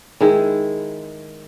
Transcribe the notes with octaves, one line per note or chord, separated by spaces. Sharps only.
D#3 G#3 E4 G#4